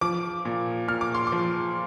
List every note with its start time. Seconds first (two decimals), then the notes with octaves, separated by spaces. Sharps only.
0.01 F3 D6
0.45 A#2
0.88 A#2 F6
1.01 D6
1.15 C6
1.27 D6
1.32 F3